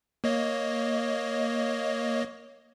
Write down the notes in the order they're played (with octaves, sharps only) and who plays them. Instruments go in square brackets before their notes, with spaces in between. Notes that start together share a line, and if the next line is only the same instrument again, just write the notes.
[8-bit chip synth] A#3 C#5 D#5